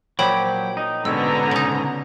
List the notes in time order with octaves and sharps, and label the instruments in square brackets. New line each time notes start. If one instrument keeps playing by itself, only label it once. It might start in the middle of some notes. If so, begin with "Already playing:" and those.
[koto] A#2 F3 [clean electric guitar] F#3 G4 [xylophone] C#5 G5 B5
[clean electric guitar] D#4
[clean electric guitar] G#2 B2 C#4 [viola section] D3 B3 A#5 [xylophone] E6
[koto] C#3 D#4